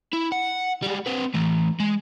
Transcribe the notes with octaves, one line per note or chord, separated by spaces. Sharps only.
E4
F#5
G3 G#3
C4 B4
E3 A3
G#3